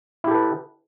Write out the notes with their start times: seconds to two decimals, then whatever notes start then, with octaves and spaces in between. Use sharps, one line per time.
0.24 E4
0.28 G4
0.31 A4
0.35 B4